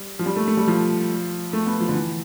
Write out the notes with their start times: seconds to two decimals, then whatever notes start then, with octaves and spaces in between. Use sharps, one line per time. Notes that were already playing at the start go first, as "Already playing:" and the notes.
Already playing: G3
0.19 F3
0.26 G3
0.36 A3
0.48 A3
0.57 G3
0.68 F3
1.53 A3
1.66 B3
1.80 F3
1.89 D3
1.95 E3